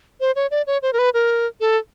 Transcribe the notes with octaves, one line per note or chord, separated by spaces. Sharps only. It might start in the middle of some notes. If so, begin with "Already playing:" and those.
C5
C#5
D5
C#5
C5
A#4
B4
A#4
A4